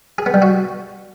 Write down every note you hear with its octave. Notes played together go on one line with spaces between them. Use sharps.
G#4
B3
G3
F#4